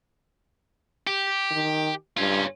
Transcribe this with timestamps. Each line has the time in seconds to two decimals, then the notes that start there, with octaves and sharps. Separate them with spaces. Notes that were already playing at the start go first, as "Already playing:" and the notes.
1.07 G4
1.51 D#3
2.17 G2 C#4 F4